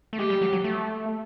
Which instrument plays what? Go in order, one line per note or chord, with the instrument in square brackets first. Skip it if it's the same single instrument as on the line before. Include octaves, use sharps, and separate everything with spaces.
[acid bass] A3
[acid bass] G#3 [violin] G4
[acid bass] G3
F#3
F#3
A3